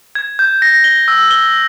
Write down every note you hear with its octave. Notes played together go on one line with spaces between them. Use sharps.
G#6
G6
A#6
G7
E6
G7